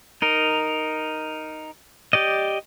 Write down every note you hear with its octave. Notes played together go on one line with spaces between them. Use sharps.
D#4 A#4
G4 D5 D#5